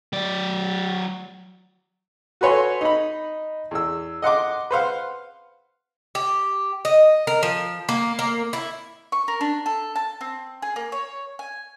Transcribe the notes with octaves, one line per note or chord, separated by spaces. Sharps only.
F#3 D5
F#4 A4 B4 C#5 G#5 C6
D#4 B5
E2 E6
D#5 F#5 C6 D6
B4 C5 F5 F#5
G4
D#5
A#4
F3
A#3
A#3
E4
C#6
A#4
D4
A4
A5
C4
G#4
A#3
C#5
G#5